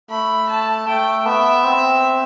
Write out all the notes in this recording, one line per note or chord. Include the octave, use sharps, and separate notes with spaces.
A3 B5
A5
A3 G5
B3 E5
C4